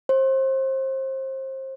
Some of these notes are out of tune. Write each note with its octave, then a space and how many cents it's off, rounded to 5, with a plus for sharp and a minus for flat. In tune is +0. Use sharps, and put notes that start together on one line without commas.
C5 +30